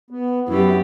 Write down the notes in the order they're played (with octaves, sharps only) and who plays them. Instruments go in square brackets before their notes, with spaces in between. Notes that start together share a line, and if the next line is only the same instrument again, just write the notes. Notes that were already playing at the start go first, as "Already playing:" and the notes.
[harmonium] B3
[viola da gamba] F#2 G4 [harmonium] B3 E4